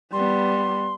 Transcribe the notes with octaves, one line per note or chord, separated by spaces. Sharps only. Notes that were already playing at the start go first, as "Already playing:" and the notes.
G3 B3 C6